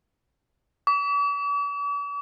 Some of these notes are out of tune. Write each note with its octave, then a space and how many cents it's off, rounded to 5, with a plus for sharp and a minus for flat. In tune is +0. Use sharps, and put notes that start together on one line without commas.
D6 -45